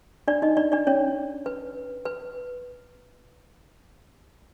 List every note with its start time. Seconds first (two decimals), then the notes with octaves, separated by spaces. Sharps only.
0.28 D4 D5
0.42 D#4 D#5
0.57 D4 D5
0.72 D4 D5
0.87 C#4 C#5
1.46 B4
2.05 B4